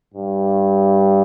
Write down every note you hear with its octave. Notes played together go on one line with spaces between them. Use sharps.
G2